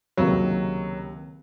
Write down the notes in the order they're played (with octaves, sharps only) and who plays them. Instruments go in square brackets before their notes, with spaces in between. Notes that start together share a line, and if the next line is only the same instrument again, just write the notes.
[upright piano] C#2 C3 D#3 A#3 [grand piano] F#3